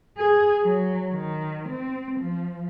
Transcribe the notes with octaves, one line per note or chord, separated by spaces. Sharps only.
G#4
F#3
D#3
C4
F3